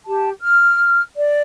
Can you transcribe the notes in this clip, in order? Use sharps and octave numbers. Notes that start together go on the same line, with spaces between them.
G4 A5
F6
D5